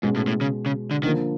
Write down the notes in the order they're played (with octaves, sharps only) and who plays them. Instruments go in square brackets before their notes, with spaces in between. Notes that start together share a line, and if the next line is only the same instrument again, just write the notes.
[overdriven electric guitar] G#2 [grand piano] B2 G#3 C#4
[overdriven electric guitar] A2
A2
C#3
C#3
D3
[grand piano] D3 F3 A#3 [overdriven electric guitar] D#3